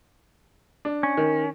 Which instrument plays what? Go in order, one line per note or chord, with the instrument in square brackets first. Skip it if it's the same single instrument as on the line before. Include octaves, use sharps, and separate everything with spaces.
[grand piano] D4
[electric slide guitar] C#4
[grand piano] D#3